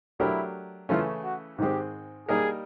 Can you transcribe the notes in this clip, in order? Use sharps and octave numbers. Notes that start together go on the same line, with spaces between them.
F#3 A3 D4 E4 G4 A#4
C#3 E3 A3 C#4 F4
F#4
G#2 D#3 G#3 C4 G4
G3 A#3 D#4 G4 G#4 A#4